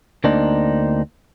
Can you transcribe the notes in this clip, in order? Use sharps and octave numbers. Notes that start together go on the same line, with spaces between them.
D2 A#3 C4 D4 D#4